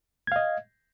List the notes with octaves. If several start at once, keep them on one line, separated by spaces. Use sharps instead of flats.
D#5 F5 G#6